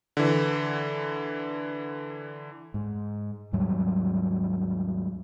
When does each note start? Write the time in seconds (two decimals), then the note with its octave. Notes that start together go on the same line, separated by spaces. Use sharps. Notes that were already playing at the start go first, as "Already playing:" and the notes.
0.17 D3 E3
2.74 G#2
3.53 D#2 G#2 F#3 G3